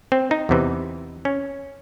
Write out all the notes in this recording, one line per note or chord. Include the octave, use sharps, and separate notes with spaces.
C4
D#4
E2 C3 E3
C#4